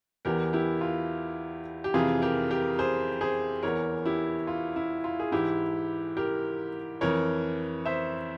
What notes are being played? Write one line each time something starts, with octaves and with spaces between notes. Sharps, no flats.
E2 E3 G4 A#4
E4 G4
F4
G4
F2 C3 E3 F4 G#4
G4 A#4
G4 A#4
G#4 C5
G#4 C5
E2 E3 A#4 C#5
E4 G4
F4
E4
F4
G#4
G#2 E3 E4 G4
G4 A#4
F2 E3 A#4 C#5
C5 E5